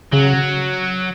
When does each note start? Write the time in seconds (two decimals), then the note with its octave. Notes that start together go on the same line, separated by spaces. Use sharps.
0.13 C#3 F#3